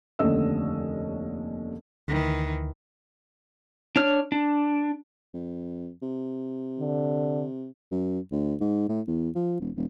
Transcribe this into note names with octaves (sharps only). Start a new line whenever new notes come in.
F1 D#2 D3 C#4 D#5 E6
D2 D#3 E3
D4 C#5 F6
D4
F2
C3
D3
F#2
D2
G#2
A2
E2
F3
E1
E1